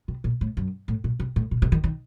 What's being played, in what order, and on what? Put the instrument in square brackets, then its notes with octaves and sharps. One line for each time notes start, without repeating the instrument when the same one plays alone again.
[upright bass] C3
A#2
A2
F#2
A2
A#2
C3
A2
A#2
C3
D#3
D#3